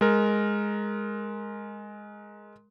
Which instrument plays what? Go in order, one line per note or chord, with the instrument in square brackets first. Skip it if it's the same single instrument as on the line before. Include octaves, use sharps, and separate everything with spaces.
[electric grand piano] G#3 A#4